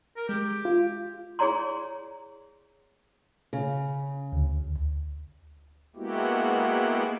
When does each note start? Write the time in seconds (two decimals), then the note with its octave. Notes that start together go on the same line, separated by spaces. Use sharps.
0.17 A#4
0.29 G#3 G4
0.65 F4
1.39 E4 G#4 C#5 D5 A#5 C6
3.53 C#3
4.32 D2
5.96 G#3 A#3 B3 E4 F#4 G4